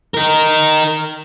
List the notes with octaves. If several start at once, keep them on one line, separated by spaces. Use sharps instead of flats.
D#4 A#4